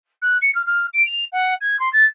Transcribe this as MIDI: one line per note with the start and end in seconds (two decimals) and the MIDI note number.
0.22 0.37 90
0.41 0.53 97
0.55 0.62 89
0.66 0.86 89
0.93 1.05 98
1.06 1.24 101
1.32 1.54 78
1.61 1.79 92
1.79 1.91 84
1.93 2.05 93